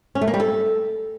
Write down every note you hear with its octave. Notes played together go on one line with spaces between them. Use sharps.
C#4
A3
A#3
G3
A4